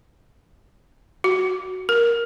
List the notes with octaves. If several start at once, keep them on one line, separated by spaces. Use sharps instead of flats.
F#4
A#4